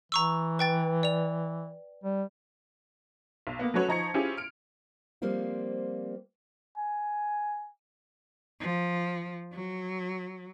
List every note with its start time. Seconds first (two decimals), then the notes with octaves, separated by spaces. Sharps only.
0.12 E3 A#5 C#6 E6
0.59 B4 G5 A6
1.03 D5 F7
2.04 G3
3.47 B1
3.59 A#3 B3
3.74 F#3 A3 C#4 F#4 B4 C#5
3.88 F3 D#4 A#5 C#6 G#6 C#7
4.14 C#4 E4 F4 G4 G#4 C5
4.37 F6 D7
5.22 F3 G3 A#3 C4 F4
6.77 G#5
8.61 F3
9.54 F#3